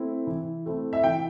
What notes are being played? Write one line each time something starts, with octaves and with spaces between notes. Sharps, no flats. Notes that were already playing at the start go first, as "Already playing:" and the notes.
Already playing: A3 C4 E4
E3
A3 C4 E4
E5
E3 G5